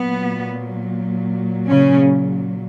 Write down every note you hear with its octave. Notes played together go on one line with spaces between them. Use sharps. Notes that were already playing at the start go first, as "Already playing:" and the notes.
Already playing: A#2 F#3 B3
C#3 C#4